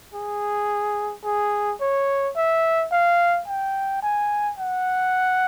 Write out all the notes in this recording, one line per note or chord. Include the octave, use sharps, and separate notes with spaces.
G#4
G#4
C#5
E5
F5
G5
G#5
F#5